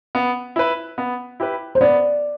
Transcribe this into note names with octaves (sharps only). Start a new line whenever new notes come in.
B3
E4 B4
B3
E4 G4 B4
C5
B3 D5